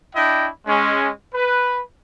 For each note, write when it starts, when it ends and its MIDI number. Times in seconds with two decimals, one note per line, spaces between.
0.16 0.49 62
0.16 0.49 64
0.16 0.49 75
0.16 0.49 79
0.67 1.10 56
0.67 1.10 61
1.34 1.81 71